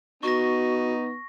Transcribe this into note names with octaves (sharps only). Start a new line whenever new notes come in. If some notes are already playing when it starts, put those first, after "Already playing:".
B3 D#4 F#4 C#6 A#6